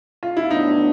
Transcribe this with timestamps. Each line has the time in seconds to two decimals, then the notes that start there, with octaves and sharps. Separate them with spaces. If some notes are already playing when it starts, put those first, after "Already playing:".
0.23 F4
0.37 E4
0.50 A2 F#3 B3 D4 D#4